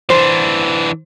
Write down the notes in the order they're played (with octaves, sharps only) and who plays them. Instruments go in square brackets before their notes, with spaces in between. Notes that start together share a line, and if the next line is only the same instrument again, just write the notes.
[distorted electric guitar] E3 D4 [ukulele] C5